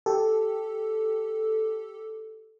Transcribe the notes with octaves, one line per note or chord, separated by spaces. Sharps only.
G4 A4